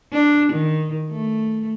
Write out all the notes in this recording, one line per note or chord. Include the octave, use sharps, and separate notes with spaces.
D4
D#3
A3